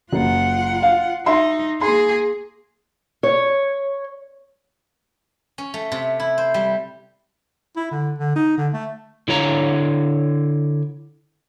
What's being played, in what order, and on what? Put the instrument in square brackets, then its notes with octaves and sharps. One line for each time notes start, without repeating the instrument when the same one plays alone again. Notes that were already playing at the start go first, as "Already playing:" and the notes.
[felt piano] F#1 [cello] F4 F#5
[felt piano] F5
[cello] D#4 [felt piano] E5 C6
[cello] A#3 G#4 [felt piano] C6
[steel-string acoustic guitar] C#5
[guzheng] C#4
A3
C3
E4
C5
G3
[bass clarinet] E4
D3
D3
D#4
D3
A3
[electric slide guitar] D3 E4 C#5 A#5